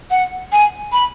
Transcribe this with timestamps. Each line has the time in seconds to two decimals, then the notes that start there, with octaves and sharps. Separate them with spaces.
0.11 F#5
0.52 G#5
0.92 B5